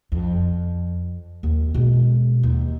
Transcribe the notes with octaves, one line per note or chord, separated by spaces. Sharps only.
F2
D#2
B2 G#3
D#2